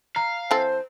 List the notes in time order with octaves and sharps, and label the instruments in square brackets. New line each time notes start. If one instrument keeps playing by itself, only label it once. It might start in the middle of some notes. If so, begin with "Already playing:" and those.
[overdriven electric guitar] F5 [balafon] A#5
[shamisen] E3 C4 A4 [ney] C5